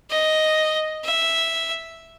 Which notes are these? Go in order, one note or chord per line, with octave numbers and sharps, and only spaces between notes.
D#5
E5